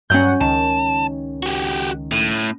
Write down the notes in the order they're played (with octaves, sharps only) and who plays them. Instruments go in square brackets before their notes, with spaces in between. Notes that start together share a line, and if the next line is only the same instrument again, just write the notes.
[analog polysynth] G2 F#3 F#5 [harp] C#4 G6
[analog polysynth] C#2 D#3 [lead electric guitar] A5
[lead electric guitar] F#4 G4
A2